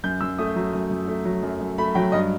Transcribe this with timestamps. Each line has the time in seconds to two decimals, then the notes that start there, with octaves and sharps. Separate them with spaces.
0.04 F#2 G6
0.21 F#2 E6
0.38 A3 D#6
0.56 F#3
0.73 F#2
0.91 F#2
1.08 A3
1.25 F#3
1.43 F#2
1.61 F#2
1.78 A3 B5
1.95 F#3 G5
2.12 G2 D#5